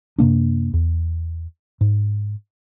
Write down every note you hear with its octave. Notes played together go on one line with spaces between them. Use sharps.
F#2 C3 A#3 D4
E2
G#2